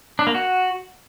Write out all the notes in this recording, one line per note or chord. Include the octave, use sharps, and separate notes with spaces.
D4
A#3
F#4